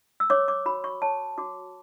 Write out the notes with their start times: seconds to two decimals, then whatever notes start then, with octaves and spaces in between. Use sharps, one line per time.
0.20 E6
0.30 C#5 D6
0.48 D6
0.66 F#4 B5
0.84 C#6
1.02 C#5 A5
1.38 F#4 D6